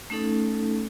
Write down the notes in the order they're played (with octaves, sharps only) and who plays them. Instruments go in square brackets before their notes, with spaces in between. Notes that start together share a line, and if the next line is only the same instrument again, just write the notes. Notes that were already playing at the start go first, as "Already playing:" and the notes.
[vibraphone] A3 C#4 D#4 A4